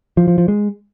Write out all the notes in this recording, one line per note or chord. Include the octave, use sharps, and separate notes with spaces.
F3
F3
F3
G#3